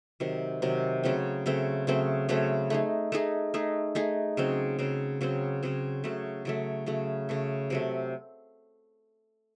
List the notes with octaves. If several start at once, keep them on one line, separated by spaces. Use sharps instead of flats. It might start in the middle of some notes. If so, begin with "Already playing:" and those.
C3 D#3 F#3
C3 D#3 F#3
C#3 F#3 A3 C4
C#3 F#3 A3 C4
C#3 F#3 A3 C4
C#3 F#3 A3 C4
A3 D#4 G#4
A3 D#4 G#4
A3 D#4 G#4
A3 D#4 G#4
C#3 F#3 C4
C#3 F#3 C4
C#3 F#3 C4
C#3 F#3 C4
C#3 F#3 A3
C#3 F#3 A3
C#3 F#3 A3
C#3 F#3 A3
C3 F#3 A3